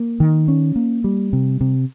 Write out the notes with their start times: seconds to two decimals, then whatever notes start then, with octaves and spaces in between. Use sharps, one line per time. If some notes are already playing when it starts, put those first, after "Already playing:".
Already playing: A#3
0.20 D#3
0.48 C#4
0.76 A#3
1.04 G3
1.33 C3
1.61 C3